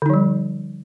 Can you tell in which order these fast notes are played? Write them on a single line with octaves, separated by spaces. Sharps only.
D3 D#4 F3 G3